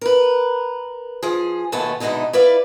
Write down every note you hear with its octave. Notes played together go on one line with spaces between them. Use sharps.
A#4 B4
F3 G#4
D#2 B2 A3 B3 C#4 A5
B2 D3 G#3 A#3 D#4 E4
E4 B4 D5 F5